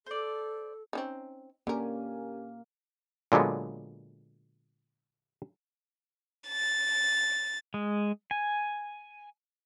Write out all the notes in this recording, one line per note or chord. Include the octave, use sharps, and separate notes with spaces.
A4 C5 D5
C4 C#4 D#4
D3 A#3 C#4 G4 A#4 G#5
A#2 D3 F#3 G#3 B3
A6
G#3
G#5